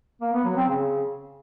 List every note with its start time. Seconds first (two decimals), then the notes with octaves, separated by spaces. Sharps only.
0.21 A#3
0.33 B3
0.45 F#3
0.57 C4
0.68 C#3